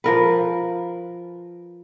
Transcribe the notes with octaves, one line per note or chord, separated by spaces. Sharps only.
F3 A#4 B4